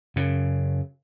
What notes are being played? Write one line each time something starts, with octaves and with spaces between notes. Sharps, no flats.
F#2 C#3